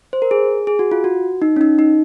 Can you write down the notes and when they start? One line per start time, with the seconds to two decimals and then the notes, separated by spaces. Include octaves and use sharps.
0.13 C5
0.22 A#4
0.31 G#4
0.67 G#4
0.79 F#4
0.91 F4
1.04 F#4
1.42 D#4
1.56 C#4
1.61 D#4
1.79 D#4